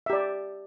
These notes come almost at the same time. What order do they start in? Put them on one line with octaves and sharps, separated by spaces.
E5 G4 D5